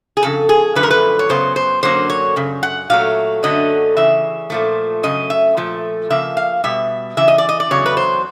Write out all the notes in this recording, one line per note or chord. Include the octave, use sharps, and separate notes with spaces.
G#4
F2 C#3 A4
G#4
F#2 D3 F3 A3 B4
A#4
B4
C#5
F#2 C#3 F#3 B3 C5
C5
F#2 D3 F#3 A#3 C5
C#5
F#2 C#3
F#5
A#2 F#3 A3 F5
F#2 D3 F#3 A3 D#5
C#3 E3 E5
A#2 F3 A3
F#2 C#3 A3 D#5
E5
A#2 F3 A3
C#3 F3 A#3 E5
F5
B2 G3 B3 E5
C#3 E3 E5
D#5
D5
D#5
D5
E2 C#3 F#3 C#5
B4
C5